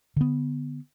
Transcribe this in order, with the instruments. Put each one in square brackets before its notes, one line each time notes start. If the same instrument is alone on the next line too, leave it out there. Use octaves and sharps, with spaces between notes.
[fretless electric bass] D3 B3